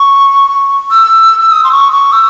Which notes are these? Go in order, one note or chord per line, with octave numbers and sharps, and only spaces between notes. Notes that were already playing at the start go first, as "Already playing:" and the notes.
Already playing: C#6
E6
E6
D#6
C6
C#6
C#6
E6